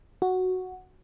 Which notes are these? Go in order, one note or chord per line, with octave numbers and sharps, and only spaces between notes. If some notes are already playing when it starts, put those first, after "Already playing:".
F#4